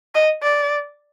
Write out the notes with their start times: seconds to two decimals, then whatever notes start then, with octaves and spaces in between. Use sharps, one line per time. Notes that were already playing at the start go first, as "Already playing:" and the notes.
0.15 D#5
0.42 D5